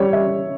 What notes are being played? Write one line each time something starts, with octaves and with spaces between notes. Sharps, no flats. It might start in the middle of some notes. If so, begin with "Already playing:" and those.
Already playing: G3 C#5
E5